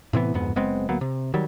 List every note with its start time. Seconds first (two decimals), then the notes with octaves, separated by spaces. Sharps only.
0.13 A2 C3 E3 B3
0.34 D1 F2 G#2 B3
0.56 F#1 G#3 B3 C4
0.89 D2 F#3 A#3 B3
1.01 C3
1.34 D#3 F#3 G3